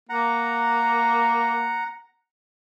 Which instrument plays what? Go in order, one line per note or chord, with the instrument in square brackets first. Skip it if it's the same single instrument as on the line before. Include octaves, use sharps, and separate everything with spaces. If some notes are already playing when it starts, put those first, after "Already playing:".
[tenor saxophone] A#3 [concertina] F#5 A#5